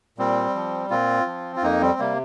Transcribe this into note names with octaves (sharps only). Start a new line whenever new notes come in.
A#2 G3 C4
F3
A#2 C4 F4
F3
F4
F2 A#3 D#4
G3 C4
C3 G3 A#3